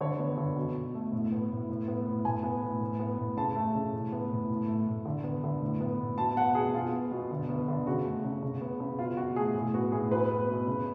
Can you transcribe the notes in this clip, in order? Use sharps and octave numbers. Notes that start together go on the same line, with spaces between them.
D3 C#5
B3
D3
B2
B2
A3
A2
B3
A2
A2
B3
A2
A2 G#5
B3
A2
A2
B3
A2
C#3 A5
A3
C#3
A2
B3
A2
A2
A3
A2
D3
B3
D3
A2
B3
A2
B2 A5
B3 F#5
B2 G#4
B2 F4
B3
B2
D3
B3
D3
C#3 F#4
A3
C#3
C#3
B3
C#3
B2 F4
B2 F#4
A3 G#4
A2
B3 F#4
A2 G#4
B2 B4
B3
B2
C#3